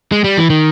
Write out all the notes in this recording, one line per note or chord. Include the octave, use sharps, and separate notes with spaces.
G#3
G3
E3
D#3